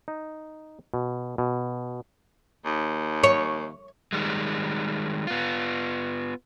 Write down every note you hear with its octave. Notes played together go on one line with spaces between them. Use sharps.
D#4
B2
B2
D#2
C#5
D#3 G3 G#3
B3 F4